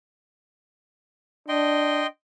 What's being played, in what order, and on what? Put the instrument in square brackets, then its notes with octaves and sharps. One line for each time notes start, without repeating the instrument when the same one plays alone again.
[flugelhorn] D4 [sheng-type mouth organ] D#5 G5 C6